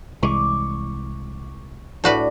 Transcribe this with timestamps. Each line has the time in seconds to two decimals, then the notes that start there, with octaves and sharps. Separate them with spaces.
0.23 C2 E3 G#3 C#6 D6
2.04 A2 D4 F#4 B4